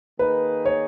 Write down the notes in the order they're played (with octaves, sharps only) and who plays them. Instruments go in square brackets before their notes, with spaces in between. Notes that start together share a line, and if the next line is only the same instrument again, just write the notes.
[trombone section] D#3 A#3 D#4 G#4 [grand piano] B4
[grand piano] C#5